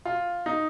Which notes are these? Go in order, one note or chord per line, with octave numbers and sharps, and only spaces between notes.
F4
D#4